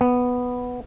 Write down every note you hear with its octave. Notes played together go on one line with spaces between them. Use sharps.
B3